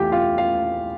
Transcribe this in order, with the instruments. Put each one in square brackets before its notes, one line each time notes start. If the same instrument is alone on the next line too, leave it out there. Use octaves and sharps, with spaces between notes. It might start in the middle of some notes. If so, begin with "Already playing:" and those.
Already playing: [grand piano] E2 E3 A3 F4 G4 G5
F4 F5
F4 F5